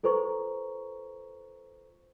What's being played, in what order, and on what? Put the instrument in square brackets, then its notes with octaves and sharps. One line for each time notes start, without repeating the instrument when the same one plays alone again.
[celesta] F4 A4 B4 C5 A#5 C#6